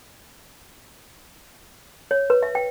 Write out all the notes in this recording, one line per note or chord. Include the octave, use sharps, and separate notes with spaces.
C#5
B4
E5
G5